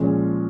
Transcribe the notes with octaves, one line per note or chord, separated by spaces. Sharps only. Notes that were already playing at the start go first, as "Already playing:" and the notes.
Already playing: A#2 F3 G#3 C#4